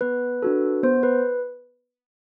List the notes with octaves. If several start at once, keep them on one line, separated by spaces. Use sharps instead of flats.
B3 B4
D4 F#4 A4
B3 C5
B4